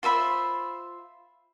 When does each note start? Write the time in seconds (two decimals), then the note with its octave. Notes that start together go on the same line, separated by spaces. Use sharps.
0.03 F4 C5 E5 B5